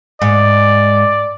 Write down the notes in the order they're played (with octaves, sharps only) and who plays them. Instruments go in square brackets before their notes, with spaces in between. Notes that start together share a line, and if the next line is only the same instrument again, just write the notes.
[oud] G#2 [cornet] D5